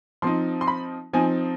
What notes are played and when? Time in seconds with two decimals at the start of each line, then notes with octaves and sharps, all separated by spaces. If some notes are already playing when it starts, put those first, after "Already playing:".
0.22 F3 C4 D#4 C6
0.61 C6
0.67 B5
1.13 F3 C4 D#4 G#5